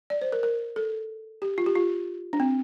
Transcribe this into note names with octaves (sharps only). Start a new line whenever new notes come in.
D5
C5
A#4
A#4
A4
G4
F4
G4
F4
D4
C4